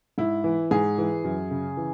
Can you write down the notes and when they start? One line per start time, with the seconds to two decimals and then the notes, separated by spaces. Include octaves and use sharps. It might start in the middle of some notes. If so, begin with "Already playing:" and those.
0.18 G#2 E4
0.44 E3
0.71 G#2 G#4
0.98 E3
1.24 F#2
1.51 C#3
1.77 E3